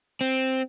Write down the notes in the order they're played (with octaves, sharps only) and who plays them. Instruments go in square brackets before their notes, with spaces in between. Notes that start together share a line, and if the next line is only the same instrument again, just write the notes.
[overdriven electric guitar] C4